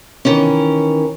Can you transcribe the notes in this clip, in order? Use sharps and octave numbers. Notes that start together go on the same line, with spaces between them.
D#3 E3 C#4